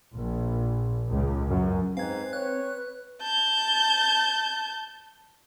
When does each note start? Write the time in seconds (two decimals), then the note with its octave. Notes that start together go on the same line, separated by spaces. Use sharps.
0.15 A#1
1.10 C#2
1.49 F#2
1.97 G#2 C4 B4 F5 G#6
2.33 B4 C#5 F#6
3.22 A5 G6